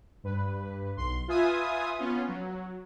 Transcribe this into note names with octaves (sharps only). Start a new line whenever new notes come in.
G2 B4
B1 C6
F4 B4 E5 G#5 D#6
B3 C#4 F4
F#3